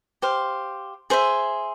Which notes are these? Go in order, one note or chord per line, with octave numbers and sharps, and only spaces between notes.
G4 C5 F5
G#4 C5 E5